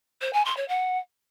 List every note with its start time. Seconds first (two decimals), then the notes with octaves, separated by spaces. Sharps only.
0.22 C5
0.33 G#5
0.45 C6
0.57 C#5
0.69 F#5